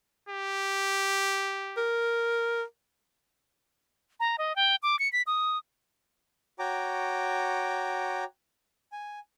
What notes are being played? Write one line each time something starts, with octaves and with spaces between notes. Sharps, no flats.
G4
A#4
A#5
D#5
G5
D6
C#7
B6
D#6
F#4 C#5 G5 A#5 D6
G#5